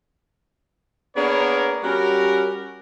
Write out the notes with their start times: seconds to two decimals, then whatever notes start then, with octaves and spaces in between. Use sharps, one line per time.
1.15 A#3 B3 D4 G#4 A#4 C#5
1.83 G3 C#4 F#4 G4 A#4